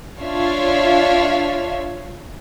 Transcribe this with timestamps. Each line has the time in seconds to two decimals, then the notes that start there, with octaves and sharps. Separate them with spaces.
0.21 D4 F4 C#5 E5 F5